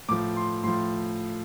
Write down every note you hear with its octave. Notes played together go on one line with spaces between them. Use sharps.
A2 F3 D6
C6
A2 F3 C6